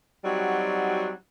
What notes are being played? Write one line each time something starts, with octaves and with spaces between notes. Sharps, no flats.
F#3 G3 C4 D#4 F#4